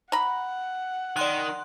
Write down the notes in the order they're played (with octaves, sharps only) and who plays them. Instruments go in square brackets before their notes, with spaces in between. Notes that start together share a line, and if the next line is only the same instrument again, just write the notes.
[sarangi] F#5 [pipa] A#5 B5
[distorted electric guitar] D#3 [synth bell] D5 C6 F#6